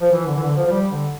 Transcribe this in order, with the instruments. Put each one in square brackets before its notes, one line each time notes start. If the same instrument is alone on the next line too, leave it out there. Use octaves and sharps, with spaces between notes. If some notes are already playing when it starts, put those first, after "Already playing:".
[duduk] F3
E3
D3
E3
D3
F3
F3
G3
D3